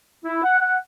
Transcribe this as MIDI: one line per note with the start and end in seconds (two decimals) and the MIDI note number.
0.25 0.41 64
0.43 0.60 78
0.60 0.76 78